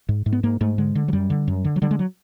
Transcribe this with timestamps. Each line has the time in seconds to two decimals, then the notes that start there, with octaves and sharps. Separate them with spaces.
0.09 G#2
0.26 G#2
0.33 B3
0.43 G#2 A#3
0.61 G#2 A3
0.78 D3 G#3
0.95 D3
1.08 F#3
1.13 F#2 G3
1.30 D3
1.48 F#2
1.65 D3
1.76 F#3
1.82 D3 G3
1.91 G#3
1.99 F#3